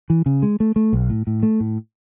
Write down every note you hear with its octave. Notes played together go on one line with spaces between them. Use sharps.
E3
C#3
G#3
A3
A3
B1
A2
A2
A3
A2